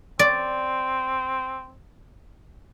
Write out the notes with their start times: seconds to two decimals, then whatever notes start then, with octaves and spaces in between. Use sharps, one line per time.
0.19 C4 D5